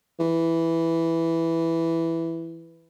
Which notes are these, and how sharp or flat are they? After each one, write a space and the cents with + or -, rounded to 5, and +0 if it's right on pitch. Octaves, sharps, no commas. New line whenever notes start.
E3 +0